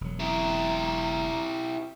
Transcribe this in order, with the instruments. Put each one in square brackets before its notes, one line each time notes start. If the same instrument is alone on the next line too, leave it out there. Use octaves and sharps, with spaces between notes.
[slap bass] E1 F#3
[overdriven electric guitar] E4 G4 [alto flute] A#5